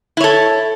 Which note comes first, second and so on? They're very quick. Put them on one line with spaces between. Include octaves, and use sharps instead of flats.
E4 C#5 A4